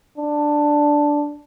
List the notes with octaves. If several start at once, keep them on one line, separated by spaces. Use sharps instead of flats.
D4